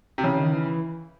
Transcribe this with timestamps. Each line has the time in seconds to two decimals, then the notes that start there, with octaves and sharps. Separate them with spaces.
0.18 C3
0.24 C#3 E3
0.38 D#3
0.53 E3